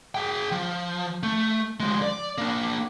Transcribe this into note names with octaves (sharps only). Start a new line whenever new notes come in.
G#4 G5
F3
A3
F3 G#3
D5
A#3 D4